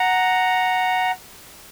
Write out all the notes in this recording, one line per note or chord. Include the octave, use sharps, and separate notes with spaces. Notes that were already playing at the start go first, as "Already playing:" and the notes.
Already playing: F#5 A#5